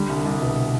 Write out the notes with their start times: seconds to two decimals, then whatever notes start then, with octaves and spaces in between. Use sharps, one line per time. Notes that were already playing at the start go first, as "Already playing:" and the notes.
Already playing: D3 G3
0.09 C2
0.25 C2
0.42 B2